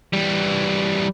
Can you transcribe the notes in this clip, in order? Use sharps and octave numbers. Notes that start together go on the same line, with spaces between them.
E3 G3